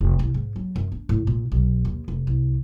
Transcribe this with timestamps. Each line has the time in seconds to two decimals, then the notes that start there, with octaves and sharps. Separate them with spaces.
0.01 F1
0.19 C2
0.34 G#2
0.56 F#3
0.76 F#2
0.92 D4
1.09 A2
1.27 A#2
1.52 B1
1.85 D#2
2.08 F1
2.27 C2